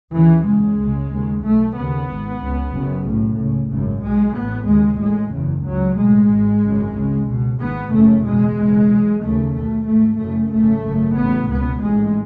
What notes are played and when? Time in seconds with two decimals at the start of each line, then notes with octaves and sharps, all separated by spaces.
0.13 D#2 C#3 E3
0.46 F#1 E2 C#3 G#3
0.78 C#2 C#3
1.11 D#2 C#3
1.43 B1 A2 A3
1.76 D#2 C#3 B3
2.08 G#1 G#2
2.41 C#2 C#3
2.73 F#1 F#2 C#3
3.06 B1 A2
3.38 C#2 C#3
3.71 G#1 F#2 C#3
4.03 B1 B2 G#3
4.36 A1 A2 B3
4.67 D#2 C#3 G#3
5.00 A1 A2 G#3
5.33 F#1 E2 C#3
5.65 C#2 C#3 F#3
5.98 B1 A2 G#3
6.30 G#1 G#2
6.63 G#1 F#2 C#3
6.95 C#2 C#3
7.28 C#2 B2
7.60 G#1 G#2 B3
7.93 F#1 F#2 C#3 A3
8.25 F#1 E2 B2 G#3
8.58 F#1 E2 B2
8.90 B1 B2
9.22 D#2 C#3 A3
9.55 B1 B2 A3
9.87 G#1 G#2 A3
10.20 F#1 F#2 C#3 A3
10.52 G#1 F#2 C#3 A3
10.85 G#1 F#2 C#3
11.17 A1 A2 B3
11.50 C#2 B2 B3
11.82 A1 G#2 G#3